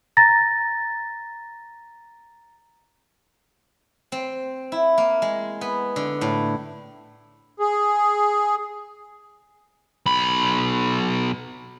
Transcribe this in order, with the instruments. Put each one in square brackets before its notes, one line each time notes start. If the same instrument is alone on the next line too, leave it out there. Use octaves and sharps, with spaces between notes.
[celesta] A#5 A6 A#6
[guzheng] C4
E4
A#3
G#3
B3
D3
A2
[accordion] G#4
[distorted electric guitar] B1 B5